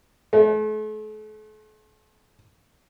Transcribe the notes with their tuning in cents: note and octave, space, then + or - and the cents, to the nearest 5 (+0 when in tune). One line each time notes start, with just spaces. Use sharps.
A3 -40